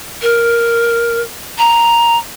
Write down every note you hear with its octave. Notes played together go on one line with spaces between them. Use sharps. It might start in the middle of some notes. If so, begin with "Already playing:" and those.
A#4
A#5